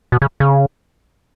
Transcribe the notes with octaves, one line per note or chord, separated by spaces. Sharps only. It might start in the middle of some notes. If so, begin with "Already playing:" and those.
B2
C#3
C#3